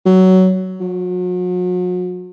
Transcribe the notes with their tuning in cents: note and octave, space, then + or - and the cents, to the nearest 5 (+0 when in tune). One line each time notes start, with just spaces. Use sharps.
F#3 +15
F#3 -40